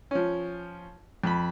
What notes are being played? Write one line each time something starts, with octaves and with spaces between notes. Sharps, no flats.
F3 C#4
F2 B5